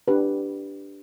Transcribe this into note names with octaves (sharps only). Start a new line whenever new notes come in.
D4 G4 B4